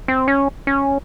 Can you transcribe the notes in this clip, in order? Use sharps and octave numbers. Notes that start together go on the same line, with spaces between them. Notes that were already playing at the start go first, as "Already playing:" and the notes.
C4
C#4
C#4